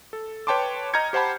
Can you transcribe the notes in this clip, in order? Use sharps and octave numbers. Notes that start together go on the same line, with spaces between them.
A4
B4 C#5 G5 A5 C6 D6
D#5 A#5 F6 G6 G#6 C#7
G4 C5 F#5 A5 B5